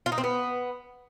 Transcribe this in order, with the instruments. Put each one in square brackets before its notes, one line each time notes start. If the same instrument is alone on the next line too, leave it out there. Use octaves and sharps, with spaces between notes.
[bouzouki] F4
D#4
C4
B3